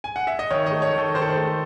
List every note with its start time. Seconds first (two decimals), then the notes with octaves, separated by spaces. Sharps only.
0.04 G#5
0.16 F#5
0.27 E5
0.39 D#5
0.51 D#3 C#5
0.66 A3 D#5
0.82 C#5
0.93 D#3
0.98 A4
1.14 D#3 C5
1.22 A4
1.30 C5
1.36 A3